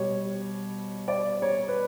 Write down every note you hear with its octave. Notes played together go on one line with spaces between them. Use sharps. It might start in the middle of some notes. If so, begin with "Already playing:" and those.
Already playing: B2 G3 C#5
D5
C#5
B4